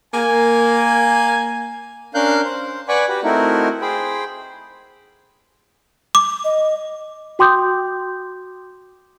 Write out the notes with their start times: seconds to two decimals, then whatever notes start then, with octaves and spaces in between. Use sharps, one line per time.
0.14 A#3 G#5
2.14 C#4 D4 A#4 F5 F#6 G6
2.45 C5
2.88 B4 D5 F#5 G#5 B5 C#6
3.08 F#4 G4 B4
3.24 A3 C4 D#4 E4 F#4 A#4
3.81 G#4 C5 G5 B5
6.15 D6
6.44 D#5
7.39 F#4 G5 C6 D6 D#6 G6